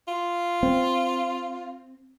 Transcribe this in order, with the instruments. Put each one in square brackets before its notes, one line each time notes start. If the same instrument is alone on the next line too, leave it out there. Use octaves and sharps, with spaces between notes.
[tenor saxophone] F4
[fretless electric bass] C4